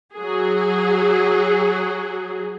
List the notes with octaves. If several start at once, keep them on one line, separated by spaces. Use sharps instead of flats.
F#3 G#4